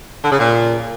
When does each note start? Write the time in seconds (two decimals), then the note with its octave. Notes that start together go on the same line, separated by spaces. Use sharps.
0.24 D3
0.31 C#3
0.38 A#2